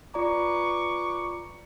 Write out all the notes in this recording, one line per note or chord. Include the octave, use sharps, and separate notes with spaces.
F4 B4 D5 A#5 C#6 D6